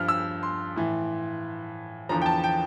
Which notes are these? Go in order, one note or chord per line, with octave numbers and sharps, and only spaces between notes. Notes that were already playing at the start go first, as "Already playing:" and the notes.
Already playing: G2 F3 F6
E6
C6
A2 E3
E2 D3 F3 A#5
G5
A5
G5